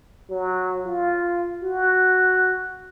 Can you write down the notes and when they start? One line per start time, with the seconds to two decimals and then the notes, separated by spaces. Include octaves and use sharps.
0.30 F#3
0.86 F4
1.63 F#4